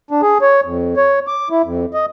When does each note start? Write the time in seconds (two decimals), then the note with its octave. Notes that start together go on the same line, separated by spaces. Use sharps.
0.11 D4
0.22 G#4
0.42 C#5
0.64 F2
0.97 C#5
1.28 D6
1.51 E4
1.64 F2
1.94 D#5